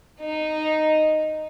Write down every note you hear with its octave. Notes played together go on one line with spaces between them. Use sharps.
D#4